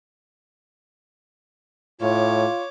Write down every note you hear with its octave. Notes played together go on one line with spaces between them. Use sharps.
A2 F4 C#5 D6